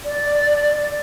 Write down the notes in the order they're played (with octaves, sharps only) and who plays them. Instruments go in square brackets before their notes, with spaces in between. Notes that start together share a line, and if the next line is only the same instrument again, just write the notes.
[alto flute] D5